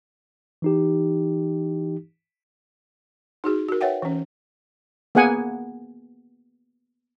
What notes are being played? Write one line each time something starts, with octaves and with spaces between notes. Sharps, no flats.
E3 D#4 G4
D#4 F#4 G#4
F#4 A#4
B4 C#5 E5 F#5 G5
E3 C#4
A#3 B3 G#4 F#5 G#5